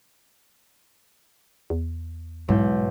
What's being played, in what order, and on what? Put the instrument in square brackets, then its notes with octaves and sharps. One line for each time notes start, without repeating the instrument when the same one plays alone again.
[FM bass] E2
[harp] B1 E4 G6 [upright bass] G#2